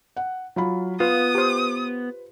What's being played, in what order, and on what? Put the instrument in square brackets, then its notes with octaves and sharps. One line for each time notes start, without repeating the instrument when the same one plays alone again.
[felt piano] F#5
F#3 F4 B5
[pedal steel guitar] B3 [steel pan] F4 [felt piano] B4 [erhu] D#6
[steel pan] G4 C5